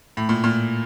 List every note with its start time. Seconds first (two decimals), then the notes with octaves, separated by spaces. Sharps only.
0.17 A2
0.29 A#2
0.44 A#2